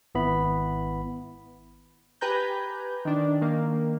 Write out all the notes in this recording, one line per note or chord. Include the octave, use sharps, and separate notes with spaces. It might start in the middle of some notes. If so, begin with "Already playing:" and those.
G#1 B3 E4 B5
G4 B4 G#5 A#5 G6
D#3 D4
D#3 A#3